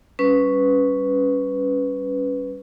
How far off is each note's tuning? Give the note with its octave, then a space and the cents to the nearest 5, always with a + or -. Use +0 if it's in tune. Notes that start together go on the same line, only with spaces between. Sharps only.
G3 +0 C#4 +5 B4 +0